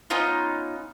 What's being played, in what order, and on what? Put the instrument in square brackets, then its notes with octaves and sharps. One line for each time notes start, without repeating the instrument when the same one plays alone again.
[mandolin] B3 C#4 D#4 F4